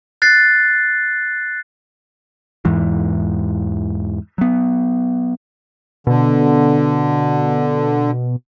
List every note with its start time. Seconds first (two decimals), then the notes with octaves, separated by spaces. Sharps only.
0.22 F#6 A6 C7
2.65 E2 G#2 E3
4.38 F#3 B3
6.07 B2 D3